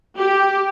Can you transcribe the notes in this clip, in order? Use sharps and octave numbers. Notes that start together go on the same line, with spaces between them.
G4